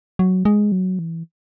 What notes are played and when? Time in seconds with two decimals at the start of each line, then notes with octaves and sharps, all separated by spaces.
0.19 F#3
0.45 G#3
0.72 F#3
0.99 E3